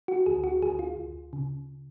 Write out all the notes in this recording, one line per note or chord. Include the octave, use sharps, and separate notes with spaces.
F#4
D2 G#4
F#4
D2 G#4
F4
D2
C#3